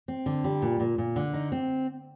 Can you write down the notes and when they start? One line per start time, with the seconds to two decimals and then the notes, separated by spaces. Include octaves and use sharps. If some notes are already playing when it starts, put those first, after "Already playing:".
0.08 C4
0.26 D3
0.44 G3
0.62 A#2
0.80 A#2
0.98 A#2
1.16 D3
1.34 D#4
1.52 C4